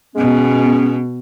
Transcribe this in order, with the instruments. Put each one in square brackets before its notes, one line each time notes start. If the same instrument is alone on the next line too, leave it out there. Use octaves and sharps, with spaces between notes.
[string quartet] B2 [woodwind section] G#3 B3 C#4